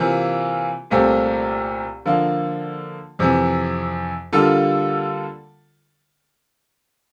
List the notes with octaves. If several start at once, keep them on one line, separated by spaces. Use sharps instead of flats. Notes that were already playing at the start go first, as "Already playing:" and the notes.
Already playing: C3 E3 A#3 F4
C2 A#2 A3 C4 G4
D3 F3 A#3
F2 C3 E3
D3 G3 A#3 F4 A4